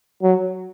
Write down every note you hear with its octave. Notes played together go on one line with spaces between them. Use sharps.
F#3